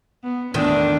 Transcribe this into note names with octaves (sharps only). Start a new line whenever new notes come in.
B3
E2 A2 D#3 D4